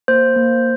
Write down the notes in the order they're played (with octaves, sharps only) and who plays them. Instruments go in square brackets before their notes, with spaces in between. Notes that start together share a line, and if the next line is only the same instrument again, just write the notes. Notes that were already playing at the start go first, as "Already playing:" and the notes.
[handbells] A#3 C5
A#3